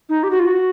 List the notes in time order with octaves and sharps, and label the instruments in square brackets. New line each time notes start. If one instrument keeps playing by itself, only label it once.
[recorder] D#4
G4
F#4
F4
F#4